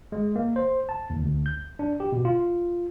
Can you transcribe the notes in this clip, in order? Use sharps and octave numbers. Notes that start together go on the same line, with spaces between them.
G#3
A#3
C5
A5
D#2
D2
G6
D4
G4
B2
F4